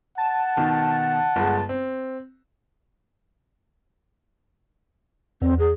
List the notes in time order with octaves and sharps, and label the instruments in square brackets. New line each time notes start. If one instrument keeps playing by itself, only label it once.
[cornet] F#5 [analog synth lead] A5
[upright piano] B2 D#3 D#4
G1 G#3
C4
[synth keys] E2 [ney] C4
[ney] G#4